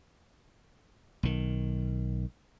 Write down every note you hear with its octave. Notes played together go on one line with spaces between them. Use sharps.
B1 D#3